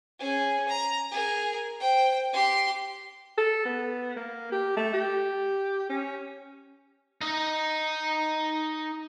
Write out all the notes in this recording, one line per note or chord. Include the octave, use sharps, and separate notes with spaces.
C#4 G#4
A#5
G#4 A#4
C5 G5
G4 C6
A4
B3
A#3
G4
A3
G4
C#4
D#4 D#5